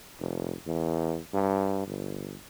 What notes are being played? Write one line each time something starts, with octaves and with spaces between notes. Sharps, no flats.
F1
E2
G2
G1